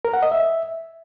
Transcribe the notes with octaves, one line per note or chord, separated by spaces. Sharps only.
A#4
F#5
D#5
E5